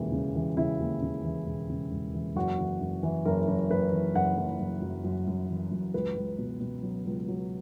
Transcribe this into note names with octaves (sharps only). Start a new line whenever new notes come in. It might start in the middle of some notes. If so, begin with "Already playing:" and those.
Already playing: E1 D#2 C#3 E3
C#3
E3
C#3 E4
D#2
C#3
E3
E1
C#3
E1
E3
F#1 F#4
E3
F#1
E3
F#1 A#4
F#1
F#1 B4
E3
F#1 F#5
F#1
F#1
F#2
F#2
F#2
E3
F#2
C#2 B4
C#2
B2
B2
F#3
C#2
F#3